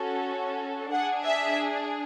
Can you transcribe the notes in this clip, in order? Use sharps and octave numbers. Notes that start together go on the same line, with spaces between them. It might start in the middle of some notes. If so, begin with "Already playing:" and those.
Already playing: C#4 F#4 A4
D4 G#4 F#5
E5